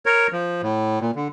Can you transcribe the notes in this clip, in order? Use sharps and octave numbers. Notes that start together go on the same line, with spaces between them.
A#4 C#5
F3
A2
A#2
D3